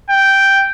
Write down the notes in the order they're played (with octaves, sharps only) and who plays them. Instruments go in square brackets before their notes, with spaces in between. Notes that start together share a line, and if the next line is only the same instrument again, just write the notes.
[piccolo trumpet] G5